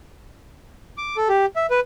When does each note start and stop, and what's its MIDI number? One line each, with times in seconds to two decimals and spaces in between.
0.98 1.17 86
1.17 1.28 69
1.29 1.46 67
1.56 1.66 76
1.70 1.80 71